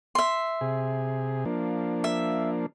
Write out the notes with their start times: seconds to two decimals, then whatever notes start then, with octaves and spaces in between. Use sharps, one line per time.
0.15 E5 C6
0.61 C3 G#4
1.45 F3 A#3 D4
2.04 E5